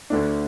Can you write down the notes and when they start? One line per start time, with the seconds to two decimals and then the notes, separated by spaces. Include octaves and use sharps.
0.10 D2 D3 A3 D4